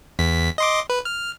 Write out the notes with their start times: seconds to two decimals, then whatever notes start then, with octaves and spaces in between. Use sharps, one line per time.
0.19 E2 B6
0.58 D#5 C6 D6
0.90 B4
1.05 F6